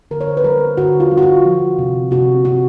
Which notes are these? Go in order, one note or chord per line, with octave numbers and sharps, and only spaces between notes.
D3 A#4
C#5
C5
B4
G3 A#4
D3 F#4
F4
G3
F#4
F4
F3
C3
C3 F#4
C3 F#4